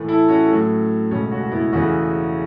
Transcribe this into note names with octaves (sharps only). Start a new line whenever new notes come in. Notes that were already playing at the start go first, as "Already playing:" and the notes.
Already playing: A2 E3 A3
E4 A4
C#4 F#4
A2 F#3 A3
C#2 B2 A3 C#4
C#4 F#4
F#4
B3 E4
E2 C#3 E3 A3 C#4 F#4